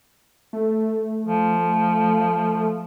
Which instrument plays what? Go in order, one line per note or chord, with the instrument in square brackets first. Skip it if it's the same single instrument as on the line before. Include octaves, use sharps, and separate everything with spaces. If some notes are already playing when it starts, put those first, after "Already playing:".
[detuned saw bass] A3
[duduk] F3